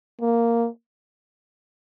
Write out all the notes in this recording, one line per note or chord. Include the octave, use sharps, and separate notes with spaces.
A#3